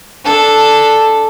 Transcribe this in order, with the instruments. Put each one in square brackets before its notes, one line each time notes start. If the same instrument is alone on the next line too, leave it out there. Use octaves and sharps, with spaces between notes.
[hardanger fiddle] D4 A4